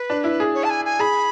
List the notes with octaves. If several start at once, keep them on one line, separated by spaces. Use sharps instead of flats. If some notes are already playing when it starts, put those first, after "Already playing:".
Already playing: B4
D4
E4
G#4
C#5
A5
G#5
G#5
G#4 B5